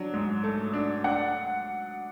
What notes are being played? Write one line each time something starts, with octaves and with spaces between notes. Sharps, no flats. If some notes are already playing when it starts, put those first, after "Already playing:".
Already playing: F#3 D4
G#2
A3
D4
D4 F#5